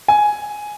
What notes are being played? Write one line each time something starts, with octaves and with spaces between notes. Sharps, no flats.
G#5